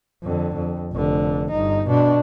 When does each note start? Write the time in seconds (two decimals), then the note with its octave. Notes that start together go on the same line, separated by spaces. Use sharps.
0.24 F2 D3
0.56 F2
0.93 F1 D3
1.51 G1 D#4
1.87 B2 D4